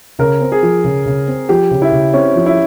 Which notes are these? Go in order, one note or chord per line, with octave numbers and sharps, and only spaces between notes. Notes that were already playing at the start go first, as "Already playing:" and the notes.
C#3 A#4
C4
G#4
F3
C#3
C#3
C4
F3 G4
C#3
E4
C#3
C4 C#4
F3
E4